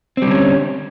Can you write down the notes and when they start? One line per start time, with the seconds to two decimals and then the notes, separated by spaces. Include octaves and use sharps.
0.17 C4
0.22 G3
0.26 D3
0.31 C#4